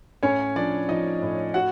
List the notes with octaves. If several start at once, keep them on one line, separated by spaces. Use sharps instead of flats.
A2 C#4 C#5
F3 D4 D5
F3 D#4 D#5
A2
F#4 F#5